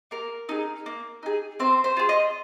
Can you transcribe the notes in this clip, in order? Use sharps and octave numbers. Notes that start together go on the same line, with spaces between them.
A#3 A#4
D#4 G#4
A#3
D#4 G#4
C4 C5
C5
F4 G#4
D#5